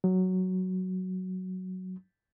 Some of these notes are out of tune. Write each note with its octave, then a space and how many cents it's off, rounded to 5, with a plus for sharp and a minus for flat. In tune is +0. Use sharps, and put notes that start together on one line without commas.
F#3 +5